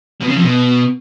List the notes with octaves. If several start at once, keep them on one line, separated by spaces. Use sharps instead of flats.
B2
C#3
F2
B2